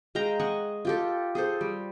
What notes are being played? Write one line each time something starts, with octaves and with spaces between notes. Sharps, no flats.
G#3 F5 G5 A#5
D#5 F#5 G#5 C#6
F4 G4 A4
G#4 A4 C5
G3